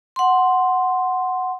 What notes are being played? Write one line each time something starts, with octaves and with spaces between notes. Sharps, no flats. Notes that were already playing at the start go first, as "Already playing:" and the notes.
F#5 C6